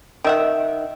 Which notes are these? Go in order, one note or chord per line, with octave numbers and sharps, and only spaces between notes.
D#3 E5 F#5